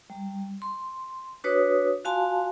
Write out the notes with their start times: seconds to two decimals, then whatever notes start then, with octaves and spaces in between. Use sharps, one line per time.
0.10 G3
0.62 C6
1.44 D4 F#4 B4 C#5 D#6
2.04 F4 F#4 F5 G#5 A5 C6